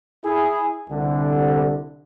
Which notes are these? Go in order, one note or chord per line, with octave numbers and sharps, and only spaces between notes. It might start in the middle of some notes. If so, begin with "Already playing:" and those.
E4 G#4
C2 D3